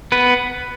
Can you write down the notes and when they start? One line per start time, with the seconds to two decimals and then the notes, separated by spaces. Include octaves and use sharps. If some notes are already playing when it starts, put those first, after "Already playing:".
0.12 B3 B4